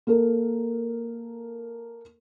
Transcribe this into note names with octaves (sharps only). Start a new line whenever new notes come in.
A#3 A4 A#4